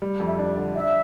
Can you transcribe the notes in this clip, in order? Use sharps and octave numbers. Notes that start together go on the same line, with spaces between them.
G3
F2
E5
D4
D5
D3
D4 E5